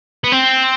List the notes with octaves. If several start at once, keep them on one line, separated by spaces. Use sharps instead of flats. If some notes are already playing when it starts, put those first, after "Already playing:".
B3
C4